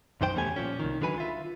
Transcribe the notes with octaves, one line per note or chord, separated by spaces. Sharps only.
B1 F#2 D#3 C5 G5
E2 B2 G3 A3 C#4 G#5
A#2 C#3 F3 C#4
C2 D#3
D3 D#3 F#3 B4 G#5 B5
F4 E5